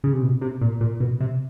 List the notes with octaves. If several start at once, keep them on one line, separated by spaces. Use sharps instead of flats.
C#3
C3
B2
C3
A#2
A#2
B2
C3